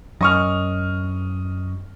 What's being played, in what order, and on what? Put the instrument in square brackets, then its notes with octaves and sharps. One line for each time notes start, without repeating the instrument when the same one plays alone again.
[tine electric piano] F#2 [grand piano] D#5 C#6 F6